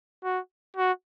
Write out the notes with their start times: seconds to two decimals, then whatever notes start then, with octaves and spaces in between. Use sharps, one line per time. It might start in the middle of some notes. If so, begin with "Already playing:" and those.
0.24 F#4
0.76 F#4